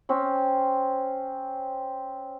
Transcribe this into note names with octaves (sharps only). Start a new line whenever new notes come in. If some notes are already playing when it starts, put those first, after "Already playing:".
C4 C#4